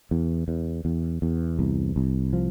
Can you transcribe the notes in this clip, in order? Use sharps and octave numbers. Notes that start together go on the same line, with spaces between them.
E2
E2
E2
E2
C2
C2
F3